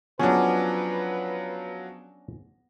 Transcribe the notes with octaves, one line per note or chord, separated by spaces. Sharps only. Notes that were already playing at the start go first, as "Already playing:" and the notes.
F3 F#3 B3 C#4 D4 G#4 B4